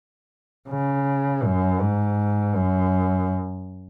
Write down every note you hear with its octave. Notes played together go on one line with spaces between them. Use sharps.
C#3
F#2
G#2
F#2